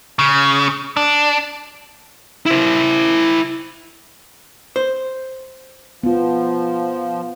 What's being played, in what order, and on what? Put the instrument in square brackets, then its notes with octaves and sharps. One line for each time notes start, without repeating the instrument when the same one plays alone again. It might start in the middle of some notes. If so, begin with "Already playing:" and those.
[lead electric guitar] C#3
D4
E4 C5
[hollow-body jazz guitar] C5
[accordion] F3 [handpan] B3 F4